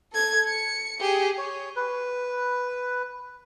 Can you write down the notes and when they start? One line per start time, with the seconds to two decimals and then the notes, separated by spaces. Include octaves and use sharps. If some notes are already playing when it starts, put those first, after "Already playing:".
0.13 A4 G#6
0.48 C#7
1.00 G4 G#4
1.38 C#5
1.76 B4